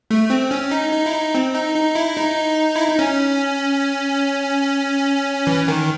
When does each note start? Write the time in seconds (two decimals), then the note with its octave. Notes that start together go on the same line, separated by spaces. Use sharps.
0.11 A3
0.30 C4
0.51 C#4
0.71 D#4
0.93 D#4
1.06 E4
1.14 D#4
1.35 C4
1.54 D#4
1.75 D#4
1.95 E4
2.16 D#4
2.76 E4
2.88 D#4
2.99 C#4
5.47 E3
5.68 D#3